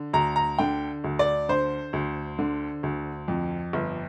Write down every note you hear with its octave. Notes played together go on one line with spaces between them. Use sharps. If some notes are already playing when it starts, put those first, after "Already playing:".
Already playing: D3
D2 A#5
A#5
D3 G5
D2
D5
D3 C5
D2
D3
D2
F2
G1